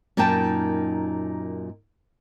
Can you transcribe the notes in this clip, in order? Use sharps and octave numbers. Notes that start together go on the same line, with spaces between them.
F#2 A#2 A#3 D#4 G5 A5